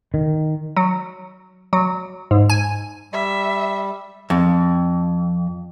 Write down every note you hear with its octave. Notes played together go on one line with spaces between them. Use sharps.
D#3
F#3
F#3
G#2
G#5
G3 E5
F2